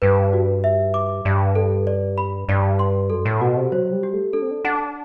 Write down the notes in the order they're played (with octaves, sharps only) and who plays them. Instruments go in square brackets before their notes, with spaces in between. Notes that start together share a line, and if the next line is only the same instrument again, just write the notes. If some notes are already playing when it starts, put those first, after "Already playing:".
[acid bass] G2 [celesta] B4
[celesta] F#4
E5
D6
[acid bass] G2 [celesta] D5
[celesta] A4
D5
B5
[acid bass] G2 [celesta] D5
[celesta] C6
[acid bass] F#2 [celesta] A4
[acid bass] A2
[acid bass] B2 [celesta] F#4
[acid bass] C3
[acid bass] F#3 [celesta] C5
[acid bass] G3
[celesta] G4
[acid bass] A3
[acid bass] D4 [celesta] A4
[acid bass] C4
D4
[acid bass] D4 [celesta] F#5